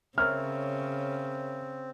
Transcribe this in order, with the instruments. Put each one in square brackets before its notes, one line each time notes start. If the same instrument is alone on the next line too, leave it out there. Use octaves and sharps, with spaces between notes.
[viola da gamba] C#3 [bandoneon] C4 [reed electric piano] A#4 C#5 E5 [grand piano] F6